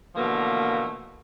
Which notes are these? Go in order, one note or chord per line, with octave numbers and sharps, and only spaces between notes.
B2 D3 E3 F3 A3 A#3